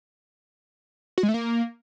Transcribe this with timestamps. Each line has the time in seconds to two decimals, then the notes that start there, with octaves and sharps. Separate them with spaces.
1.18 F#4
1.23 G#3
1.29 A3
1.34 A#3